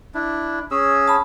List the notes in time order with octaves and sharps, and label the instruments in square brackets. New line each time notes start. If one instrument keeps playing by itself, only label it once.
[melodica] D4 E4
C#4 G#4 E6
[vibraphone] A5 B5